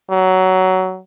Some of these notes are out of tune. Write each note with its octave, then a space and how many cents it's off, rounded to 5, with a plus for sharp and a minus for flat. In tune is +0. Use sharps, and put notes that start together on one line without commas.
F#3 +15